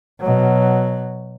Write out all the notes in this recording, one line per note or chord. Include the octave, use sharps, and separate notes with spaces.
B2 F#3